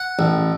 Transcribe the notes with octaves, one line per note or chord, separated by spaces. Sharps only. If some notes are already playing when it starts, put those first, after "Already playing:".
Already playing: F#5
A1